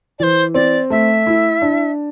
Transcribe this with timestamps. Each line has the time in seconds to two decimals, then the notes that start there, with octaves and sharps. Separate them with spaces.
0.19 E3 C5 D5
0.54 C4 D5
0.90 A3 E5
1.27 E4
1.62 D4